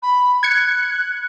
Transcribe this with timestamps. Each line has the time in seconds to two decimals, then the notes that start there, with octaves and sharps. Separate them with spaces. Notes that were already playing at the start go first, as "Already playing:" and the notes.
0.03 B5
0.43 F#6 G#6 C#7